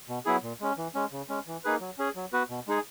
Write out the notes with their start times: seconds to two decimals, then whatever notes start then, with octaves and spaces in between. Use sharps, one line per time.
0.09 B2
0.26 F#3 B3 E4 G#4
0.43 A#2
0.61 G#3 C#4
0.78 E3
0.95 G#3 C#4
1.12 C#3
1.29 G#3 C#4
1.47 E3
1.64 A#3 D#4 G#4 B4
1.81 F#3
1.98 C#4 G#4
2.16 F#3
2.33 B3 F#4 B4
2.50 B2
2.67 G#3 D#4 G#4